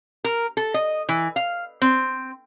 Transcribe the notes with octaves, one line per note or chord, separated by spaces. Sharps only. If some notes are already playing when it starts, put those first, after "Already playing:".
A#4
A4
D#5
E3
F5
C4